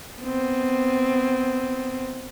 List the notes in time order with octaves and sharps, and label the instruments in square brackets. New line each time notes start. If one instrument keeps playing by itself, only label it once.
[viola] B3 C4